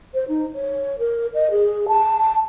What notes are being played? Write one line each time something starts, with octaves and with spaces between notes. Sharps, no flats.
C5
D#4
C#5
A#4
D#5
G#4
A5